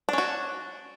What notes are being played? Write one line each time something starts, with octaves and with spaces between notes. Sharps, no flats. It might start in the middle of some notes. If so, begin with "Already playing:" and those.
C#4 D4 F#4